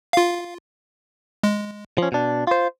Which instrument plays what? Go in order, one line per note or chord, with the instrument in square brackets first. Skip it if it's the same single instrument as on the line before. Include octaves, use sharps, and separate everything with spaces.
[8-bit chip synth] F4 F5
G#3
[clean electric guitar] F3 C#4
B2 D4
F4 C5